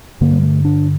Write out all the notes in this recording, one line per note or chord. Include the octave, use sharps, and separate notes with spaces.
G2 D3 A#3
G3
A3
D4